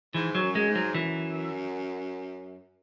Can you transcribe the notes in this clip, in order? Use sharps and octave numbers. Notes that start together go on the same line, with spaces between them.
G#2 E3
F#3
F#2
G#3
G#2
F#3
F#2 E3